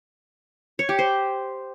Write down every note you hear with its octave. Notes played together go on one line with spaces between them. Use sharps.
C#5
G4
C5